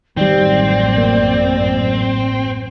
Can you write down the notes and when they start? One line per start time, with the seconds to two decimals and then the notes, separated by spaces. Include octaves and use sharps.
0.17 A1 F#2 D#3 G3 C4 D5
0.98 A#3